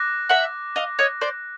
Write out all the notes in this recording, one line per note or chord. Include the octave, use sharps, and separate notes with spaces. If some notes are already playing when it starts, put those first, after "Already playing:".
Already playing: D6 F#6 A#6
E5 F#5
D#5 F5
C#5 D#5
C5 D5